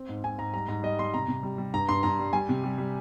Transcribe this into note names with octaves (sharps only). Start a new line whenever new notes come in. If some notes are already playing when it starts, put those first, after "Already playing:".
Already playing: C4
G#2
G#2 G#5
G#2 A#5
G3 A#5
G#2 A#5
G3 D#5
G3 C6
C3 A#5
C3
G3
G3
G2 A#5
G2 C6
G2 A#5
G3
G3 G#5
C3
G3
G3